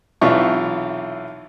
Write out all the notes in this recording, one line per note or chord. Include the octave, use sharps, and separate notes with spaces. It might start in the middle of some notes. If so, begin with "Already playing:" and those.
B1 C3 E3 F4 E5 C#6